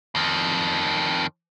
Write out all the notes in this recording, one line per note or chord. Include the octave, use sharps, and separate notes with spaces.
F2 D#3